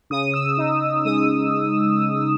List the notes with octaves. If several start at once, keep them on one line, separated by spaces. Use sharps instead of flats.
C#3 D#6
E6
D#4
G#3 D#6